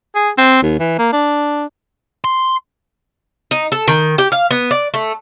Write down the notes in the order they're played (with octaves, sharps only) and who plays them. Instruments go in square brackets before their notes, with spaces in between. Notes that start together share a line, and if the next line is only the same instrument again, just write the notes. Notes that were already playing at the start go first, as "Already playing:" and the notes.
[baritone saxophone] G#4
C4
D#2
E3
A#3
D4
[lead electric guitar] C6
[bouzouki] D#4
A4
D#3
G4
F5
B3
D5
A3